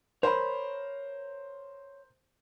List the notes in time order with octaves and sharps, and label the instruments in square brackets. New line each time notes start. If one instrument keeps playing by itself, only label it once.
[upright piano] A#4 C5 [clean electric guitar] C#5 B5